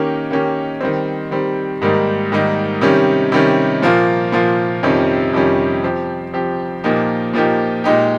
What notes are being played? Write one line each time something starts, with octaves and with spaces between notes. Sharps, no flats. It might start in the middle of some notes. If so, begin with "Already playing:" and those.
Already playing: D#3 A#3 C#4 G4
D#3 A#3 C#4 G4
D#3 G3 C4
D#3 G3 C4
G#2 D#3 G3 A#3 D#4
G#2 D#3 G3 A#3 D#4
C3 D#3 G3 C#4
C3 D#3 G3 C#4
A#2 F3 A#3 F4
A#2 F3 A#3 F4
F2 C3 D#3 G3 C#4
F2 C3 D#3 G3 C#4
F3 C4 G4
F3 C4 G4
A#2 F3 A#3 D#4 G4
A#2 F3 A#3 D#4 G4
A#2 G#3 D#4 G4